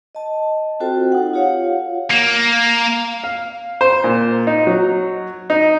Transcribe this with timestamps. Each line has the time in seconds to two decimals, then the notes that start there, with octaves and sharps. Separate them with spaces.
0.15 D#5 A5
0.80 C4 F4 F#4 A4 C5 G5
1.12 D#4 F#5
1.33 F4 G4 C#5 F5 F#5
2.11 A#3
3.24 F5
3.81 C5
4.04 A#2
4.47 D#4
4.67 F#3
5.50 D#4